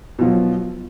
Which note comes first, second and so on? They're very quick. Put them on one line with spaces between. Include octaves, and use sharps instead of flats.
B2 F3 F#3